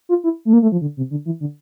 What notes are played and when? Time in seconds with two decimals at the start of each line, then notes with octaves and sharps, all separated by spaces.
0.09 F4
0.24 E4
0.45 A3
0.53 A#3
0.62 A3
0.72 F3
0.81 D3
0.97 C3
1.11 D3
1.26 E3
1.40 D3